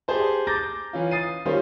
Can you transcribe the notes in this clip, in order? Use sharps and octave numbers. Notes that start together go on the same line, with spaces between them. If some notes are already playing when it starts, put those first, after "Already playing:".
G4 G#4 C5 A5
A#5 D6 G6 A6 A#6
E3 C#4 F4
D#6 A6 C7 D#7
D#3 G3 A#3 C#4 F4 C5